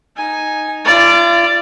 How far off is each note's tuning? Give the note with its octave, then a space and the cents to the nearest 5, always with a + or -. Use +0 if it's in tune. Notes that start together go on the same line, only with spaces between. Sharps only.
D#4 +0 G#5 +0
F4 -40 D5 +0